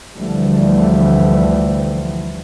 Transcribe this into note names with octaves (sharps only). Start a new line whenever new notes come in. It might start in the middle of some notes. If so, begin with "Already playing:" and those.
D2 D3 E3 F3 G3 A3